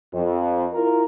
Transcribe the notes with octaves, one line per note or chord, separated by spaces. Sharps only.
F2
E4 F4 A#4